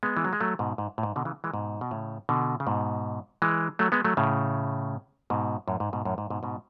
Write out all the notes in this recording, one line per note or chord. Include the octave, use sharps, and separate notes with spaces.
G#3 B3
E3
F#3
G#3
F#3 A3
G#2 B2
G#2
A2
G#2
B2 D3
C#3 E3
E3 G#3
G#2 B2
B2
A2 C#3
B2 D3
C#3
G#2 B2
E3 G#3
F#3 A3
G#3 B3
F#3 A3
A2 C#3
G#2 B2
F#2 A2
G#2
G#2 B2
F#2 A2
G#2
G#2 B2
G#2 B2